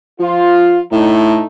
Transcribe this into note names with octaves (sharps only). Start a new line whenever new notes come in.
F3 F4
A2 A3 D#4